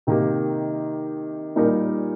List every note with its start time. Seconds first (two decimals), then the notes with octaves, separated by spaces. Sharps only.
0.07 C3 D#3 A#3 G4
1.56 A#2 G3 D#4 G4 A#4